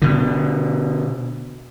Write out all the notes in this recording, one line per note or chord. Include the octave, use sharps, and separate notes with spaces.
B2 D3